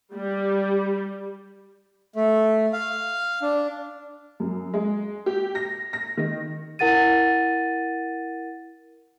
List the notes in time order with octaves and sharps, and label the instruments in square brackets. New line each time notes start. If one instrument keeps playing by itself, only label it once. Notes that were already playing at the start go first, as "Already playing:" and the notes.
[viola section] G3
[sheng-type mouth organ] A3
F5
D4
[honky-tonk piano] F#2
G#3
G4
A#6
A#6
D#3
[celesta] E4 A#4 F#5 A6 D#7